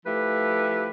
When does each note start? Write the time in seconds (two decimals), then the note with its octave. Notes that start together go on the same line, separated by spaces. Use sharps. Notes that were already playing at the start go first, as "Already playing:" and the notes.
0.05 F3 A3 E4 G4 B4